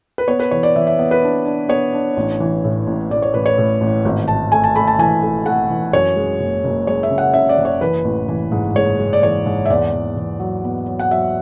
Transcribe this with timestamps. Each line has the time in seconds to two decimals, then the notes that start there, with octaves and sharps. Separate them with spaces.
0.18 B4
0.28 B3 C#5
0.40 B4
0.51 E3 C#5
0.63 D5
0.76 E3 E5
0.87 E5
0.99 B3
1.11 B4
1.23 D4
1.45 D4
1.69 B3 C#5
1.93 D4
2.17 A1
2.40 E3
2.64 A2
2.87 A1
3.10 A1 D5
3.22 C#5
3.34 A1 B4
3.46 C#5
3.58 A2
3.81 A1
4.05 G#1
4.28 G#1 A5
4.52 A3 G#5
4.64 A5
4.76 A3 B5
4.87 A5
4.99 E3 G#5
5.23 A3
5.46 A3 F#5
5.70 E3
5.93 F#2 C#5
6.16 G#3
6.40 F#1
6.64 F#1
6.87 G#3 C#5
7.03 E5
7.10 C#3
7.18 F#5
7.34 C#3 E5
7.49 D5
7.58 F#1
7.65 C#5
7.81 E3 B4
8.05 A1
8.28 E3
8.51 G#2
8.75 G#3 C#5
8.99 G#3
9.13 D5
9.23 E3 C#5
9.46 G#2
9.65 E5
9.70 E2 D5
9.93 E2
10.16 E2
10.40 F#3
10.64 B3
10.87 F#3
10.99 F#5
11.11 F#3 E5